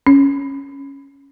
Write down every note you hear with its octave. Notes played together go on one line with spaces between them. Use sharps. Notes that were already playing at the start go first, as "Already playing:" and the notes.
C#4